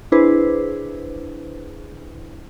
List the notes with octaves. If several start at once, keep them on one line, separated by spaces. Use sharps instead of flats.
D4 E4 G#4 B4 C5